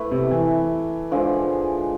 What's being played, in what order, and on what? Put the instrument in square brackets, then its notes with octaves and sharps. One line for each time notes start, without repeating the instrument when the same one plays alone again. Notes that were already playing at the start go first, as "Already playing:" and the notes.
Already playing: [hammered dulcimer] A3 E4 B4
[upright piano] C3
E3
[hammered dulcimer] D3 F3 G#3